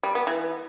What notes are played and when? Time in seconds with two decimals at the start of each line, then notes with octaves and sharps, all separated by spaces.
0.03 G3
0.15 B3
0.27 E3